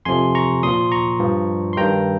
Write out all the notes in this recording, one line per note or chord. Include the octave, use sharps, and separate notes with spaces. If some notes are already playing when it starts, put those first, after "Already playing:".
F2 C3 F3 G#5 C6
A#5 C#6
A#2 F3 C6 D#6
A#5 C#6
G2 F3
C6
G2 D#3 G5 A#5